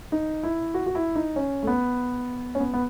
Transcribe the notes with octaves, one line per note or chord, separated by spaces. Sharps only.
D#4
E4
F#4
F#4
E4
D#4
C#4
A3
B3
C#4
B3
B3